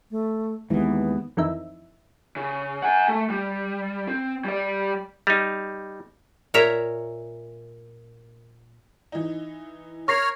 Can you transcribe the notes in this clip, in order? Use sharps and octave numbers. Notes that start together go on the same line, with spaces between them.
A3
D#2 E3 G#3 B3
F2 D#3 E3 D#4 E5
C#3
F#5 G#5
A3
G3
C4
G3 D5
G3 D#4
A#2 A#4 C#5 E5 A#5
E3 D#4
A#4 C#5 C#6 F6 A#6 C7